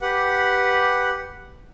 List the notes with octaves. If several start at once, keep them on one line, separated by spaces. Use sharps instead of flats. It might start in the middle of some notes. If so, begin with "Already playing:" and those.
G4 B4 F#5